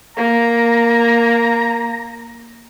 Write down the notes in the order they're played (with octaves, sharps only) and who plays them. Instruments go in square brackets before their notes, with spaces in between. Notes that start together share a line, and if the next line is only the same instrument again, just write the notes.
[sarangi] A#3 [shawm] A#5